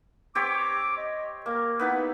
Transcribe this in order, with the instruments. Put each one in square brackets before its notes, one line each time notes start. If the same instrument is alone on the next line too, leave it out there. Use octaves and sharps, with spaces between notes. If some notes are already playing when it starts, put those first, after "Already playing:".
[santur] C4 G4 C#5 [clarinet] D6
[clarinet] D#5
[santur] A#3 [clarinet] A#4
[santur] B3 D#4 E4 [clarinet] B4